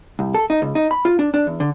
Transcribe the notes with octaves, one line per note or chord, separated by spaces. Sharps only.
C2
A4
D#4
C#2
D#4
B5
F4
D4
D4
E2
D3